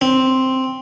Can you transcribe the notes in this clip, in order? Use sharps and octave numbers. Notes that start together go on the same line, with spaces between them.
C4